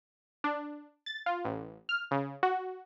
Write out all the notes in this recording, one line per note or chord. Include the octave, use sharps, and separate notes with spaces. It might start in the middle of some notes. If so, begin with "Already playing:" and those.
D4
A6
F4
A1
F6
C#3
F#4